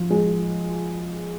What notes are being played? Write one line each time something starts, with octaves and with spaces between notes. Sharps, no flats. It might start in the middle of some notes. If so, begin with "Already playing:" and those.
Already playing: F3
G#3